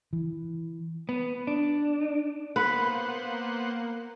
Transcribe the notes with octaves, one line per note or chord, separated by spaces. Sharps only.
E3
B3
D4
A#3 B3 B4 C5 F#5